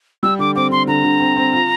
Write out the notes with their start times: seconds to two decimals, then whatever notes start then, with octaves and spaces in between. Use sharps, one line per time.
0.23 G3 E6
0.39 D3 D6
0.56 C4 D6
0.71 D3 C6
0.87 D3 A#5
1.04 D3
1.20 C4
1.36 C4
1.53 F4